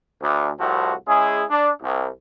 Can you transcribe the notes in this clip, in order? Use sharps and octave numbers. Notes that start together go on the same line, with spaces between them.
D2
C2 A2 F3 C4 F#4
G#3 C#4 E4 G#4
D4
C2